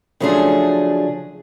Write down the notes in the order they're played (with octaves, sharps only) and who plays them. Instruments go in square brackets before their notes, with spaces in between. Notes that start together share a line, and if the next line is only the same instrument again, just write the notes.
[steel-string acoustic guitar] C#3 F3 F#3 A3 D4 G#4